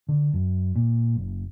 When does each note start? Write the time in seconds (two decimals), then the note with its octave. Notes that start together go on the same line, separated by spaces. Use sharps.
0.09 D3
0.33 F#2
0.75 A#2
1.16 F#1